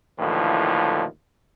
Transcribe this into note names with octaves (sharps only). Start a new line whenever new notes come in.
D#2 A2 D3 E3 F3